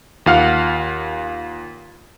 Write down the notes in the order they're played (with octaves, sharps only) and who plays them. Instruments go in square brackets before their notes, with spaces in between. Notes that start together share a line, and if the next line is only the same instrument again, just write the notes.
[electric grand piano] D#2 F4 F5 F#5 F6